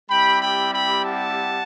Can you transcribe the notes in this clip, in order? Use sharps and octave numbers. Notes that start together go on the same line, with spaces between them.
G3 C4 E4 G4 G5 B5
G5 B5
G5 B5
F#5 A5